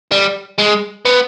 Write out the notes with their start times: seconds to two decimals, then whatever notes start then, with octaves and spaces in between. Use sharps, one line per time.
0.12 G3
0.59 G#3
1.05 B3